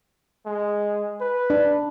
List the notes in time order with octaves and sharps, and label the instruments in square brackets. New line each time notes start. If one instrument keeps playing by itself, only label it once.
[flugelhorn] G#3
B4
[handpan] D4